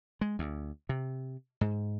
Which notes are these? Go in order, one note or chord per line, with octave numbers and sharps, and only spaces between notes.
G#3
D2
C3
G#2